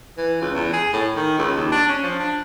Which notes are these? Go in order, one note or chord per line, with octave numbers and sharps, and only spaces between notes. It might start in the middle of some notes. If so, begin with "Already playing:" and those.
E3
C#2
E2
G#4
A2
D#3
C#2
D#2
D4
C#4
F3
D4